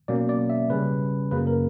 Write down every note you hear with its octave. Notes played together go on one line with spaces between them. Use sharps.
B2 F#3 A#3 C#4 D5
D5
E5
C#3 G3 C#4 B4
F#2 C#3 F#3 A#3 B4
A#4